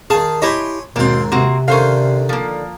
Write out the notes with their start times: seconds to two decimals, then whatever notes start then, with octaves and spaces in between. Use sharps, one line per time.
0.10 D#3 G#4 F5 A5
0.42 E4 G4 C#5 D#5 G#5 C6
0.96 D#2 G#2 B2 A#3 C4 C6
1.32 C3 A#3 C4 F#4
1.68 D3 D#3 C#4 C5 F5
2.29 F3 A#3